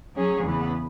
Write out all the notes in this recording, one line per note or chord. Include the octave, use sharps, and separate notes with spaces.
F#3 C#4 G#4 C#5
E2 C#3 E3 B3